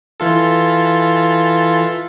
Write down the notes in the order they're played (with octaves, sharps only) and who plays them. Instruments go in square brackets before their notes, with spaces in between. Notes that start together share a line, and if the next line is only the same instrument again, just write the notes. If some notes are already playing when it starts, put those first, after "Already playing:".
[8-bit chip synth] E3 F4 A4